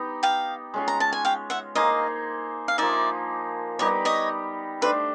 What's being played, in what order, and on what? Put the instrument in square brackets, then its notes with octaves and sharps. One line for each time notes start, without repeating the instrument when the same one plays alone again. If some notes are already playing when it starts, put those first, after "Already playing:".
Already playing: [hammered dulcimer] B3 D#4 G4
[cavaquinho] F5 G5
[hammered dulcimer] G#3 C#4 F4
[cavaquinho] A#5
A5
G#5
F5 G5
E5 F#5
[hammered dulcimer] A#3 D#4 G#4 C5 [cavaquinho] D#5 F5
[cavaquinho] F5
[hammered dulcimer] F3 A#3 D#4 [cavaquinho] D5 E5
[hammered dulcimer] G3 B3 D#4 G4 [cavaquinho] C#5 D#5
[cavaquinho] C#5 D#5
[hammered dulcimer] A3 D4 G4 C5 [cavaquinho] B4